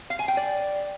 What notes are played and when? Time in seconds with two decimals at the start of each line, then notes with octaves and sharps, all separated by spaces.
0.10 F5
0.19 G#5
0.28 G5
0.37 D5